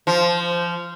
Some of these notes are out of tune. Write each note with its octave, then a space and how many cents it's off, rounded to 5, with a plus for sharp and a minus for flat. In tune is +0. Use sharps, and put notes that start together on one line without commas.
F3 -15